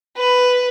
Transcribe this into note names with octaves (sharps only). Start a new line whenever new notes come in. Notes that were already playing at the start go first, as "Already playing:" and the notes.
B4